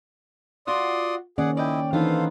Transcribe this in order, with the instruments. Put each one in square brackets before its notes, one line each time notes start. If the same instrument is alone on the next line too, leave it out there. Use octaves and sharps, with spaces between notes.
[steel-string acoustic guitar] F4 F#4 F#5 [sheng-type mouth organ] D5 C6 D#6
[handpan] D#3 A#3 C#4 [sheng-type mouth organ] G#4 F#5 [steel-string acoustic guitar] D5
[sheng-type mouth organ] E4 D#5 [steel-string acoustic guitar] D5 G5
[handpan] E3 D4 D#4 [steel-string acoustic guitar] B3 F4 [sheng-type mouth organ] A4 C5 F5